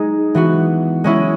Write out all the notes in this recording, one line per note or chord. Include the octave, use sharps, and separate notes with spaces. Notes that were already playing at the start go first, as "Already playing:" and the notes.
Already playing: G#3 D#4 G#4
E3 B3 F#4
G#3 C#4 E4